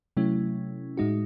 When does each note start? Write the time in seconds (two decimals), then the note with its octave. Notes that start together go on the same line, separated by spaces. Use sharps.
0.17 C3 F#3 A3 C#4 E4
0.97 A2 G#3 D#4 F#4